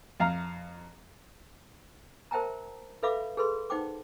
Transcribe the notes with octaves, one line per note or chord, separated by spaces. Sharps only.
F2 F5 A#5
A#4 C5 E5 G5 A5 A#5
A4 B4 E5 F5 B5 D6
G#4 A4 B4 B5 C6
D#4 C5 F#5 G5 D6